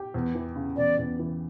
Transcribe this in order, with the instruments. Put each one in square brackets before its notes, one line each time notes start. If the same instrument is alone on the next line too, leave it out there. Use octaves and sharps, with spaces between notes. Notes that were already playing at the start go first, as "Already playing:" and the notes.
Already playing: [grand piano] G4
E2
E3
C#3
[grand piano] E2 [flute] D5
[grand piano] E2
E3